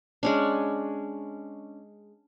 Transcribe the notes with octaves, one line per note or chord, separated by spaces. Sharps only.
G#3 C#4 D4